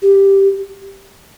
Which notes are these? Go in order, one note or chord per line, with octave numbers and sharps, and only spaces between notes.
G4